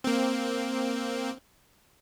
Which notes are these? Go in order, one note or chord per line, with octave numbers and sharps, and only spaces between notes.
A#3 C4